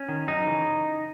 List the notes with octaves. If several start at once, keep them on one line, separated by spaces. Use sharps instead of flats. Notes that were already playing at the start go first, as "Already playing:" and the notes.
Already playing: C#4
D#3
F#2 D#4
C#3 E3